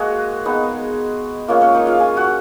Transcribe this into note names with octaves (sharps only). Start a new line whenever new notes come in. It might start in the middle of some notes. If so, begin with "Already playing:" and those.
Already playing: G#3 A#3 F#4 G#4
G#3 B3 D#4
G#3 A#3 C#4 F4 A#4
C#4 C#5
D#4 D#5
F4 F5
G#4 G#5
F#4 F#5